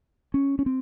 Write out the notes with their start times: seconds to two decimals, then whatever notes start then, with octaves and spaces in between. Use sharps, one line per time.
0.34 C#4
0.59 C#4
0.66 C4